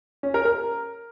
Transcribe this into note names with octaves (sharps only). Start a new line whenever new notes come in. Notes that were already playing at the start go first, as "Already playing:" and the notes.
C#4
A#4
A#4